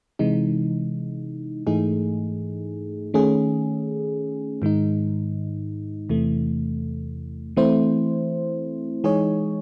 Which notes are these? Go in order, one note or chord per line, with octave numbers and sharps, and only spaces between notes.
C3 E3 G#3 D#4
G#2 E3 A3 D#4 G#4
D#3 A3 C#4 G#4
G#2 D#3 G#3 D#4
E2 C3 E3 A3
E3 A3 C4 E4 C5
E3 G#3 D#4 G#4 C#5